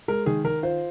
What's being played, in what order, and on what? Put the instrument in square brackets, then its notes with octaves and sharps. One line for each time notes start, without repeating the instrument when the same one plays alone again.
[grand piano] G#3 A#4
D#3 G#4
D#3 A#4
F4 C5